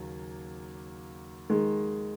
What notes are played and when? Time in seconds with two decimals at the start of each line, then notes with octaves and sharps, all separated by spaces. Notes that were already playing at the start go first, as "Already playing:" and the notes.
Already playing: D#2 C#3 F#3 A#3
1.50 D#3 G#3